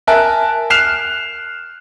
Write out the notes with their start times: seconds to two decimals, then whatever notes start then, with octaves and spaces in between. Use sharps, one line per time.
0.07 A#4 E5 G#5 A5 F#6
0.70 F6 F#6 C7 E7 F7